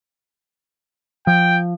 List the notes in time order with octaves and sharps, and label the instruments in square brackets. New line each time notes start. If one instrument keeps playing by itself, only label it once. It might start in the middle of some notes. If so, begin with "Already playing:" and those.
[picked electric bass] F3 [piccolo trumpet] G5